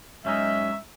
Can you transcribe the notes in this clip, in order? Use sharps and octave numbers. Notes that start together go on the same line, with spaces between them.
F#2 G#3 C#4 D#4 E5